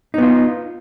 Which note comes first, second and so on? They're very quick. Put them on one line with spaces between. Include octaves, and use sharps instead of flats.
D#4 B3 F4